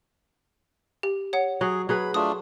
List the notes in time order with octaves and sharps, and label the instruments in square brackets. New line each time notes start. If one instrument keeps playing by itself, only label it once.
[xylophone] G4
C#5 F#5
[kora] F#3 [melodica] G#4
[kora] F#3 G#4 B4 [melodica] B5
[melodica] A3 D4 F4 [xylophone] D#6